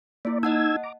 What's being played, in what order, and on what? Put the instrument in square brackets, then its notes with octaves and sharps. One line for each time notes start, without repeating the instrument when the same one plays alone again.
[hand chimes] A#3 E4 [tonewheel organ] D5
[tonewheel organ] D#4 E6 G#6 [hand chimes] D#5 F#5 A5
[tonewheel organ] A#5 D6